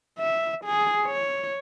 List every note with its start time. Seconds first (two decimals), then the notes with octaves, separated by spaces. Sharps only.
0.19 E5
0.65 G#4
1.05 C#5